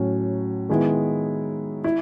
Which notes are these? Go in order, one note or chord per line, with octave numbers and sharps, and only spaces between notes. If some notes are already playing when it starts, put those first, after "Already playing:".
Already playing: A2 F#3 C#4
D#3 G#3 B3 E4
E4